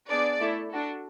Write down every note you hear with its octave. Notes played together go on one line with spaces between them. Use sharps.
B3 D4 G#4 D5
A3 E4 A4
D4 F#4 A4